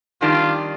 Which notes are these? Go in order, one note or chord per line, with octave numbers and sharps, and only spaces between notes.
F2 D#3 G3 D4 F4